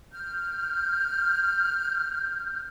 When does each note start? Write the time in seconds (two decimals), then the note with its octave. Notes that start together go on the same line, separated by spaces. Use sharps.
0.12 F6 G6